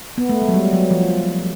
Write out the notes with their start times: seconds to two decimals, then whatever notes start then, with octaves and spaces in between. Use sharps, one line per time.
0.18 B3
0.29 A3
0.42 G#3
0.48 F#3
0.54 G3
0.73 F#3
0.91 F3